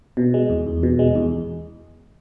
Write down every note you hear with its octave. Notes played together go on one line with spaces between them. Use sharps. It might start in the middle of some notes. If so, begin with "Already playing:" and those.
B2
G#3
E2
E2
B2
G#3
E2